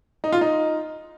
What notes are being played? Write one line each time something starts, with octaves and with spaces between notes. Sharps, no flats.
D#4
F4
D#4